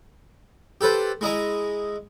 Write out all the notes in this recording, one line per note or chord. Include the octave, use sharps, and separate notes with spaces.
G4 A4 B4 C5
G#3 E4 D#5 A#5